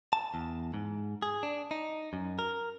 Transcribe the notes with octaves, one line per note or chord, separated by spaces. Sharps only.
A5
E2
G#2
G#4
D4
D#4
F#2
A#4